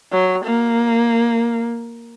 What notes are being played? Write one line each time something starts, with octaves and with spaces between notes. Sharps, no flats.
F#3
A#3